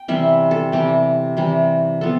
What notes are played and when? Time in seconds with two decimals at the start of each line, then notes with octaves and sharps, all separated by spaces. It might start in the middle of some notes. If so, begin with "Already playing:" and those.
Already playing: G5
0.08 C3 E3 G3 E5
0.51 A4
0.72 C3 E3 G3 G4
1.37 C3 E3 G3
2.01 F3 B3 A4